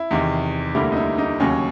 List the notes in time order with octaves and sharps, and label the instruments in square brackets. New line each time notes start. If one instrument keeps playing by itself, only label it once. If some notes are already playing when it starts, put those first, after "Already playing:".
Already playing: [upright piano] E4
E2 C3 D#3
D2 D3 G3 A#3 E4
D#4
E4
D#4
D#2 C#3 F#3 C#4